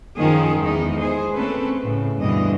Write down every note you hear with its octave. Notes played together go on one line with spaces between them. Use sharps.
F#2 D#3 F3 G#4
E2 G#3 D#4 D#5
G#4 C5
A3 C4 C#4 A4 B4
A2 C#3
D2 G2 B2 D3 E3 D#5